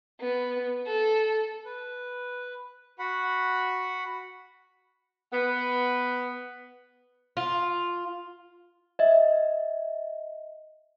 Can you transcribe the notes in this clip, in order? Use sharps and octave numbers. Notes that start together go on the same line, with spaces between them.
B3
A4
B4
F#4 F#5 B5
B3
F4
D#5 E5